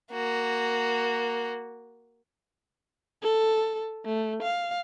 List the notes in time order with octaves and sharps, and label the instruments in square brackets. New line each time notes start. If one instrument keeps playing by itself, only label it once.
[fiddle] A#3 F#4
[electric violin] A4
A3
F5